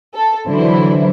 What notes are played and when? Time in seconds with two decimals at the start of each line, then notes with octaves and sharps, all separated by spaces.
0.15 A4
0.47 D3 E3 F#3 E4 C5